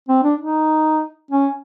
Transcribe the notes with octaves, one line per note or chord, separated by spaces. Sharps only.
C4
D4
D#4
C#4